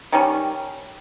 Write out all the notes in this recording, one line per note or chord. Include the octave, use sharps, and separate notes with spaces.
D#3 G3 C#4